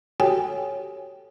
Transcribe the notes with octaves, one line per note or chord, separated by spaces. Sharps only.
F#4 G4 A4 C#5 G5 G#5